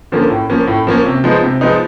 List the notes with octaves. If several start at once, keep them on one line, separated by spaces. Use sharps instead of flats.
D3 F3 A#3 C#4
A2
F3 A#3 C#4
A2
F3 A#3 C#4
C3
F3 G#3 B3 D#4
C3
F3 G#3 B3 D#4